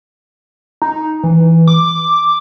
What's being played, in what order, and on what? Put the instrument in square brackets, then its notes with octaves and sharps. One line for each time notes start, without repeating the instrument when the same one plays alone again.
[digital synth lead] D#4
E3
D6